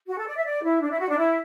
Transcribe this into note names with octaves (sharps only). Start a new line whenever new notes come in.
F#4
A4
D5
E5
D5
E4
D4
E4
F#4
D4
E4